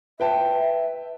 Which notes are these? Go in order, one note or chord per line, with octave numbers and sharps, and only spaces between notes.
B4 E5 G5 A5